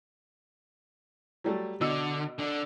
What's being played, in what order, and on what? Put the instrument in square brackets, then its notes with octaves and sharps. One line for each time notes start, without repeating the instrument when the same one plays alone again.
[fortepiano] F#3 G3 A3
[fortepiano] B2 D#5 E6 [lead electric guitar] D3
[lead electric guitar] D3 D4